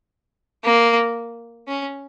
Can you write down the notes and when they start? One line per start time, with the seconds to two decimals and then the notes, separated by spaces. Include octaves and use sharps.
0.65 A#3
1.68 C#4